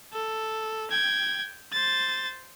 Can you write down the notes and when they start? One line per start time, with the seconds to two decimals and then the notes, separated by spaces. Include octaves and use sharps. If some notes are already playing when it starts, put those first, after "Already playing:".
0.13 A4
0.91 G5 G#6
1.73 C5 A6